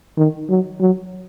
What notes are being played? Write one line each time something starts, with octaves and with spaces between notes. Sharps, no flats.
D#3
F#3
F#3